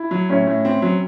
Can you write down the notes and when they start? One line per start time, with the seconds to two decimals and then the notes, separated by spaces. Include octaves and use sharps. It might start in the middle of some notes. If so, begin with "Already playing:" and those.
Already playing: E4
0.11 F#3
0.29 A2 C#4
0.47 A2
0.65 C4
0.82 F#3